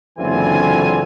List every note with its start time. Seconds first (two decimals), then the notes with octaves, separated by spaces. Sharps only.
0.18 F#1 D3 E3 C4 F4 G#5